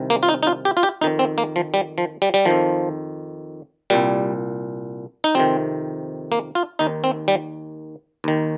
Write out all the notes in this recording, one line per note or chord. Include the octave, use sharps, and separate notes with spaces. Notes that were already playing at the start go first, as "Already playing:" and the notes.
Already playing: C2 C3 D#3
A#3
F4
D#4
D#4
F4
G4
F4
G4
F2 D#3 D#4
C4
A#3
F3
G3
F3
G3
G3
F2 D#3 F3
C2 A#2 G3
D#4
F2 C3 D#3 C4
A#3
F4
D#2 D#3 D#4
C4
G3
D#2 D#3